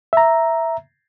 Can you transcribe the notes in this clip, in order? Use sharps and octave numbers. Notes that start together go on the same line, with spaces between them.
E5 A#5